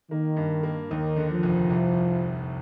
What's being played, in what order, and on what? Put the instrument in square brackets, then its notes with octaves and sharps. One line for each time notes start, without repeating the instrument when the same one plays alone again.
[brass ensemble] D#3 [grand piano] A#3
[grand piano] G2
A#3
[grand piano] D#2 [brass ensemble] D#3
[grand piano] D3
[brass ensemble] F3
[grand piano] F1
C2